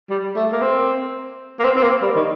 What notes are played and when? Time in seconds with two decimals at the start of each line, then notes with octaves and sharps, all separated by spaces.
0.10 G3
0.36 A3
0.52 A#3
0.61 C4
1.59 A#3
1.64 C4
1.76 C4
1.83 A#3
2.02 G3
2.16 D#3